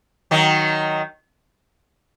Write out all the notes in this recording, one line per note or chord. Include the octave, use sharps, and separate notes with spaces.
D#3 F#3